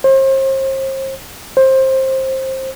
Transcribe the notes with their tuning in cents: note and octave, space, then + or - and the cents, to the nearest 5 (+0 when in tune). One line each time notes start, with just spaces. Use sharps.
C5 +40
C5 +20